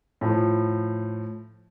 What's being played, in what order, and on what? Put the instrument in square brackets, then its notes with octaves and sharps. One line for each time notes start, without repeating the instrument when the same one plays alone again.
[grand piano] A2 F3